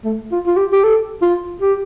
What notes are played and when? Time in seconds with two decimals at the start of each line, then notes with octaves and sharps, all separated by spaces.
0.04 A3
0.32 F4
0.47 F4
0.57 G4
0.73 G4
0.84 A4
1.22 F4
1.61 G4